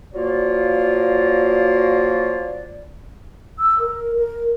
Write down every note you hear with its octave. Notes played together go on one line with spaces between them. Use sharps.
F3 F#3 A#3 F4 F#4 D5
E6
A#4
A#4